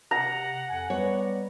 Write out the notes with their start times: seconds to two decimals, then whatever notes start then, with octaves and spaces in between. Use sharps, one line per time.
0.11 C3 F#5 A#5
0.68 F2 G#5
0.90 G3 B3 C#5